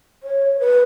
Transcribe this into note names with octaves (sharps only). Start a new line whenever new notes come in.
C#5
B4